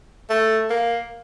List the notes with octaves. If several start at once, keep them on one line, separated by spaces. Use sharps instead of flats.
A3
A#3